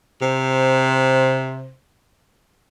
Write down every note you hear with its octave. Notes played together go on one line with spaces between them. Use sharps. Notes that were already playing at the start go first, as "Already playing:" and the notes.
C3 C5